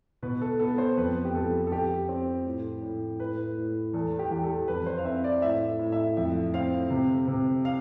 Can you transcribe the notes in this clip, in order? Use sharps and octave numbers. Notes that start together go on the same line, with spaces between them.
B2 B4
A4
B3 A4
C5
F2 B4
G4
F2 A4
A4
F2 G4
C4
A2
A2
A2 B4
A2
E2 A4
G4
E2 G4
A4
F2 B4
C5
F5
C4 E5
D5
A2 E5
A2
E5
F2 E5
C4 F5
C3
C3
F5